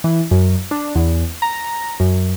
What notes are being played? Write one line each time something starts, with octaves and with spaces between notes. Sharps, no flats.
E3
F#2
D4
E2
A#5
F#2